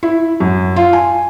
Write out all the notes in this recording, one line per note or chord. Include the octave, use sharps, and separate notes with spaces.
E4
F#2
F4
G#5